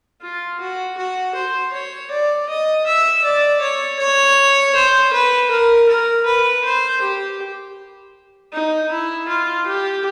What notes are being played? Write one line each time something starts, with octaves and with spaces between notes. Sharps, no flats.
F4
F#4
F#4
C5
C#5
D5
D#5
E5
D5
C#5
C#5
C5
B4
A#4
A#4
B4
C5
G4
D#4
E4
F4
G4